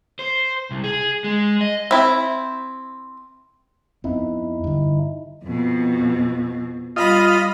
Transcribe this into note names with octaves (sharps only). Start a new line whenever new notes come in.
C5
C2
G#4
G#3
D#5
C4 E4
F2 B3 C4 D#4 E4
G2 D3
F2 B2
G3 F4 D#5 B5 A#6